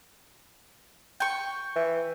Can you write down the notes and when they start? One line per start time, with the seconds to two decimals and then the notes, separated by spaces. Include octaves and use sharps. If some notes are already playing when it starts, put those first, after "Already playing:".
1.20 G5 C#6
1.76 E3